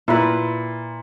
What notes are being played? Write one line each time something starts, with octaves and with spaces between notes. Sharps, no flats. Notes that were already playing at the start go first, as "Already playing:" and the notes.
A#2 E4 A#4 B4